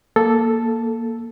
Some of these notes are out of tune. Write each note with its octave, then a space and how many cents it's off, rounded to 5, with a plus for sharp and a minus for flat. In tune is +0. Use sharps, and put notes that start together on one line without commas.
A#3 +0 A4 +0